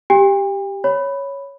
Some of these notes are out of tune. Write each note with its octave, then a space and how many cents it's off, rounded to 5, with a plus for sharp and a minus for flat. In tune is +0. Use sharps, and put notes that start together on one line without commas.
G4 +0 G5 +40
C#5 +0 B5 +0